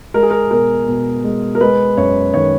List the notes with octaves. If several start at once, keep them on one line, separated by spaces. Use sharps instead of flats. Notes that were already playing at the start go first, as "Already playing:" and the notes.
G#3 A#4
G#4
A#4
B2 A#4
B2
G#3
A#4
G#3 B4
F#2 C#5
D#3 C#5